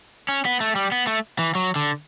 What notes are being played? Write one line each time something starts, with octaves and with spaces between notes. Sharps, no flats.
C#4
B3
A3
G3
B3
A3
E3
F#3
D3